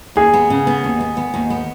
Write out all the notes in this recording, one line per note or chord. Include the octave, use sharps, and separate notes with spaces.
D#2 G#4
B3
C#3
B3
D#2
B3
B3
D#2
B3